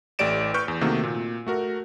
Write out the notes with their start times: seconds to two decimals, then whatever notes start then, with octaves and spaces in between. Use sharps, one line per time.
0.19 A1 A3 G4 D5 D7 E7
0.54 B4 C#6 F6 G6
0.68 E2
0.81 C3 D#3 A3 A#3 F#4
1.03 A#2
1.46 A3 F#4 A#4